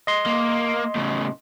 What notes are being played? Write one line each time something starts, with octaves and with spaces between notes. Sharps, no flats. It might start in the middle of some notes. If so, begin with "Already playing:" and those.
D#5 C6
A#3
A2 C#3